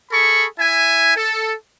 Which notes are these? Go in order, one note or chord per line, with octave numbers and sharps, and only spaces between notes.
G#4 A4 B5 C#6
E4 E5 G#5
A4